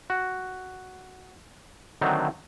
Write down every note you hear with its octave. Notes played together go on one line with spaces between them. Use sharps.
F#4
D3 D#3 F#3 A3 C4